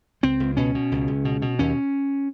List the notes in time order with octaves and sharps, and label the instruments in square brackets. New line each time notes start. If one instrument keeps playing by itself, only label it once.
[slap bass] C#2 C4
C#2
B2 C#4
B2
C#2
C#2
B2
B2
D#2 C#4